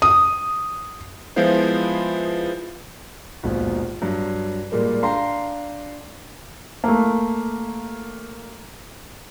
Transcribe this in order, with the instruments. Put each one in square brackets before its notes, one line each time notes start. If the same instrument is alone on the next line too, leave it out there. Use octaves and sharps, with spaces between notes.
[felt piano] D#6
[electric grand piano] F3 G#3 B3 E4 F4 C5
[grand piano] A#1 D#2 G#2 B2
G2 F#3
A#2 G3 G#3 A#3
D4 F5 G5 A#5 C6
[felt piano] A3 A#3